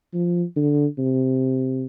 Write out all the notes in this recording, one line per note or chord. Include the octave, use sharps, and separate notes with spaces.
F3
D3
C3